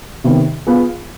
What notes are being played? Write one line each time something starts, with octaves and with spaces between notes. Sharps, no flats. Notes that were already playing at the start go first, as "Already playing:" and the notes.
C3 D#3 B3
B3 F4 G#4